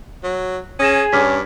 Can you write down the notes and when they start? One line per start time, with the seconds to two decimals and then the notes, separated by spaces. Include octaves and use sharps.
0.24 F#3
0.80 C#4 G#4 D#6 A#6 E7
1.13 G2 C#4 D6 F6 B6